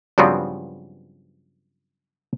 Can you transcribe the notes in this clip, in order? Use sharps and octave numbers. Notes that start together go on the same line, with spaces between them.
G2 C#3 F3 F#3 B3 C4